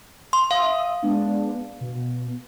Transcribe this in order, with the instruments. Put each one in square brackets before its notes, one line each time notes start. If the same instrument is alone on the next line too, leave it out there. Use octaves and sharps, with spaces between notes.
[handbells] C6
[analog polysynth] E5 D#6 [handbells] F5
[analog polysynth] G#3 B3 D4
B2